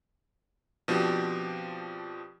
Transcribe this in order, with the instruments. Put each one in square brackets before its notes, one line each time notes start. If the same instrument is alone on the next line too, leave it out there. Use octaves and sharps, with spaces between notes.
[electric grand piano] B2 F3 C4 D4 G4